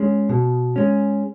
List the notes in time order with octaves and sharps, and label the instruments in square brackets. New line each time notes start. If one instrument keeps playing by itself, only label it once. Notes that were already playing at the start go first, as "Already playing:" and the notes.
Already playing: [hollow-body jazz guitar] G#3 C#4
B2
G#3 C#4